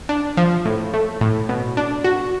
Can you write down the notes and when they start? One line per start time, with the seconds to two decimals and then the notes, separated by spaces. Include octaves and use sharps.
0.09 D4
0.37 F3
0.65 A2
0.94 A3
1.21 A2
1.49 B2
1.77 D4
2.04 F#4